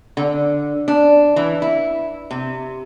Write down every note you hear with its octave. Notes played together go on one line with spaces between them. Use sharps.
D3
D4
E3
E4
C3